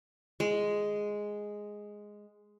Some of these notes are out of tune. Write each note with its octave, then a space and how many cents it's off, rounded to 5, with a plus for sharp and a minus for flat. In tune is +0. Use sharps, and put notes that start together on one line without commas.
G#3 +0